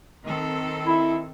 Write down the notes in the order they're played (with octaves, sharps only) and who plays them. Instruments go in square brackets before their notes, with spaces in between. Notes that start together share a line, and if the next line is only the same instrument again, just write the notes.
[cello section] D#3 C4 A4
[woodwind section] E4